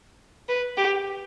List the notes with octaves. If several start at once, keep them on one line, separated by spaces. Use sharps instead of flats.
B4
G4